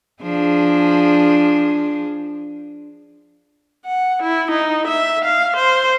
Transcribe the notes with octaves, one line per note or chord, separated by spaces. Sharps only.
F3 D4 G#4
F#5
E4
D#4
E5
F5
C5